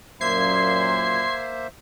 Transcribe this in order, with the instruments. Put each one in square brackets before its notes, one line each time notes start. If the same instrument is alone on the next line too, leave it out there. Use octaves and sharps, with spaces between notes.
[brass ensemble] F#2 A#2 [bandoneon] A#3 C5 E5 [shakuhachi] C6 [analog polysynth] G#6 C7